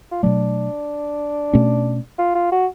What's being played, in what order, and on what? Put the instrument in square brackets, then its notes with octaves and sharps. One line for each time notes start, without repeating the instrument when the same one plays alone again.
[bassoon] F4
[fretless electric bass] B2 F#3 A3 [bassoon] D4
[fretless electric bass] B2 A3 C#4
[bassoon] F4
F4
F#4